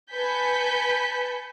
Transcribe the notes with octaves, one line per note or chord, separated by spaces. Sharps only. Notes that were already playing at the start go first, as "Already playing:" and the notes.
B4 G#5 A5 G6 B6 C#7